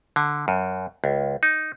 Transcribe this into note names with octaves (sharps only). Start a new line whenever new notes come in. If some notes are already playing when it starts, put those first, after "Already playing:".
D3
F#2
C#2
D#4